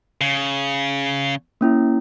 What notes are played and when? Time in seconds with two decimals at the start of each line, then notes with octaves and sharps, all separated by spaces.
0.21 C#3
1.61 A#3 C#4 E4